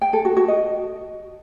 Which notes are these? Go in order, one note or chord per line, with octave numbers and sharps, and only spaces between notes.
G5
A4
F#4
F#4
D#5